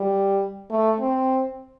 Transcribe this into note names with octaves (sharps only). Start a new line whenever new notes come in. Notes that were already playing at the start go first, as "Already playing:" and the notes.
Already playing: G3
A3
C4